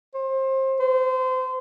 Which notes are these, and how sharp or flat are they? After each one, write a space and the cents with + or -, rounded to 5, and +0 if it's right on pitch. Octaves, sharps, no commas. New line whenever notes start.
C5 +25
C5 -25